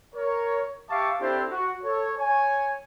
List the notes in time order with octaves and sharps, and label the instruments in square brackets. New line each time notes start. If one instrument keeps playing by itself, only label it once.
[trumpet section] A#4 C#5
G4 E5 F5 A5 C#6 D6
C4 D4 E4 G4 A4 C5
F#4
A4 C#5
C#5 G#5